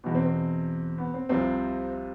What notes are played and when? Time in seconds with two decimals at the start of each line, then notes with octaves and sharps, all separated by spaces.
0.04 E2 B2 B3
0.15 C4
0.26 C4
0.98 B3
1.14 C4
1.29 C2 C3 F3 C4